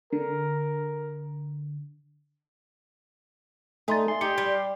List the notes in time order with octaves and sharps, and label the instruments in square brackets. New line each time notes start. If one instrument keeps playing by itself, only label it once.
[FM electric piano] D3 [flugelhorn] A#4
[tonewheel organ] A3 [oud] D#4 [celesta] G#5 C6 A6
[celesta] E5 G#5 [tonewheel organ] C6
[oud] D#4 [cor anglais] G4 [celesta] C#7
[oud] G3